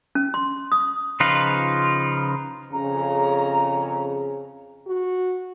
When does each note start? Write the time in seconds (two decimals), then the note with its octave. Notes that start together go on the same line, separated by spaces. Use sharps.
0.15 C#4
0.34 C6
0.72 D#6
1.20 C#3 F3 D#4 F4 B4
2.72 F2 C#3 A#5
4.87 F#4